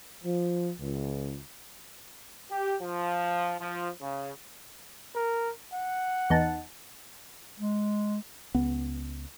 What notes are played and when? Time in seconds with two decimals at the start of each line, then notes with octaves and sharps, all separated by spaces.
0.24 F3
0.78 C#2
2.50 G4
2.80 F3
3.61 F3
4.01 C#3
5.15 A#4
5.73 F#5
6.30 E2 D#4 A5
7.58 G#3
8.54 C#2 B3